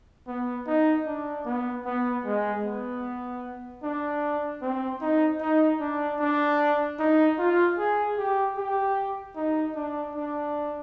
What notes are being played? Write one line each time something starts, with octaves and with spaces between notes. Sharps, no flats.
B3
D#4
D4
B3
B3
G#3
B3
D4
C4
D#4
D#4
D4
D4
D#4
F4
G#4
G4
G4
D#4
D4
D4